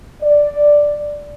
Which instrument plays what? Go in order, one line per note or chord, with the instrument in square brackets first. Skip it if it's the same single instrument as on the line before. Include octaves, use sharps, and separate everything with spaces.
[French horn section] D5